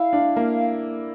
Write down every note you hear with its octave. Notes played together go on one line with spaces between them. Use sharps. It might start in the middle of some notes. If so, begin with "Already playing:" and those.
Already playing: E4 F5
D4
A#3